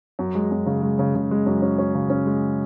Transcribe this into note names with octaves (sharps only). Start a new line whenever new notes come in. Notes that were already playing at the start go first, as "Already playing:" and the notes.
F#2
G#3
F#2
C#3
G#3
C#3
C#3
G#3
F#2
C#4
C#4
C#3
C#4
G#3